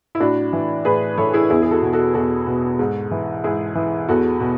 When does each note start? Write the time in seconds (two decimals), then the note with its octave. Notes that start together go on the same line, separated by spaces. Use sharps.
0.15 E4
0.20 A2 D4 F#4
0.53 E3
0.85 A2 G#4 B4
1.18 E3 A4 C#5
1.33 E4 G#4
1.50 E2 E4 G#4
1.62 G#4
1.71 F#4 A4
1.82 B2
1.93 F#4 A4
2.14 E2 F#4 A4
2.47 B2
2.79 G#2
3.11 E3
3.44 G#2 E4 G#4
3.75 E3
4.08 E2 F#4 A4
4.40 B2